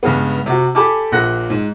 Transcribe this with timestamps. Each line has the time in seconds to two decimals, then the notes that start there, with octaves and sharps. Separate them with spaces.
0.03 G2 C#3 G#3 B3
0.46 C3 F#4
0.75 G4 A4 G#5 A5 B5 D6
1.12 A#1 A#2 F#5 F#6 A#6
1.50 G#2